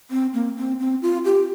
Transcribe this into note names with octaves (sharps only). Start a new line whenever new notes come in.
C4
A#3
C4
C4
F4
G4